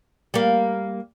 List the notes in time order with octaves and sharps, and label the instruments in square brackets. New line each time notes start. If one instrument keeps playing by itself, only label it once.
[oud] G3 A#3